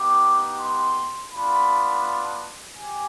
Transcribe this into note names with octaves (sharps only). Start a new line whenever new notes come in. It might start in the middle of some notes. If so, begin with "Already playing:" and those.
Already playing: B3 D#4 G4 D6
C6
B3 D4 F4 B5
G4 G#5